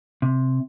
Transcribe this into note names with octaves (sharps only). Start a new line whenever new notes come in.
C3